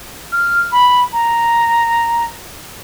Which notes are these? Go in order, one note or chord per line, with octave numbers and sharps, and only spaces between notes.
F6
B5
A#5